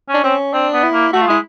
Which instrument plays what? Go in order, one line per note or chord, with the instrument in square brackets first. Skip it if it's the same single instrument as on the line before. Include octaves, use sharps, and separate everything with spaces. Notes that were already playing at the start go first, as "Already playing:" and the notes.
[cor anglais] C#4
[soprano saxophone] D4
[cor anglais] C4 [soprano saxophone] C#4
[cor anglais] C4 [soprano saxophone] D4
[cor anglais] B3
[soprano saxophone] E4
[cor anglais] A#3
[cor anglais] A3 [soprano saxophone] F#4
[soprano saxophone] F4
[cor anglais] G#3 [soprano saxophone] E4